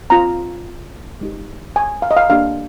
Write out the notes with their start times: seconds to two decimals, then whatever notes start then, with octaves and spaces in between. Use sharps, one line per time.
0.10 C4 F4 A#5
1.21 G#3 D#4 G4
1.76 G#5
2.02 F5
2.11 D#5
2.17 F5
2.30 A#3 D4 G4 F5